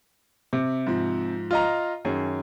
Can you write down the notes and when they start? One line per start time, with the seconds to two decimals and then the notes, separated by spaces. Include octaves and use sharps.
0.53 C3 D6
0.87 G#2 F3
1.51 F4 D#5 A#5
2.05 F#2 D#3 G#4 C#5